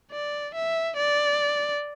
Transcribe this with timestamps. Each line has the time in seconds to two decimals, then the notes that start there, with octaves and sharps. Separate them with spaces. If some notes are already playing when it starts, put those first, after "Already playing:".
0.12 D5
0.55 E5
0.97 D5